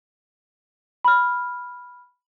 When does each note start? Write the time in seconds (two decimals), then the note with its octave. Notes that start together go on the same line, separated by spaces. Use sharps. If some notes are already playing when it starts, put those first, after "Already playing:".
1.05 B5 F6